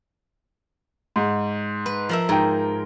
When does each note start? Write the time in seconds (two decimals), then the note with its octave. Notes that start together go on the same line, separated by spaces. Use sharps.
1.16 G#2
1.86 B4
2.09 F3 A#4 E5
2.29 G#2 A#4 G5